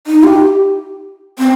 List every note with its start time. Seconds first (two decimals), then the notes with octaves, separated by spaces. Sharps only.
0.07 D#4
0.24 G4
1.39 C4